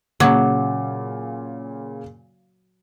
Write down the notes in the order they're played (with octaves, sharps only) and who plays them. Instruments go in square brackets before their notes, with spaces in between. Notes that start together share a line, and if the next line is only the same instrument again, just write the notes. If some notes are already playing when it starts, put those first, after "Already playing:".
[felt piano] A#2 C#3 [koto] F#3 [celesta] F#5 D6